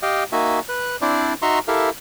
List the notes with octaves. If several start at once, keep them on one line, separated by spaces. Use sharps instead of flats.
G4 D#5 F5 G5
A#3 D#4 F#4 E5 G#5
B4 F#6
C4 D4 E4 C5 D5
D#4 F#4 E5 A#5 C6 C#6
E4 G4 A4 A#4 E5 F5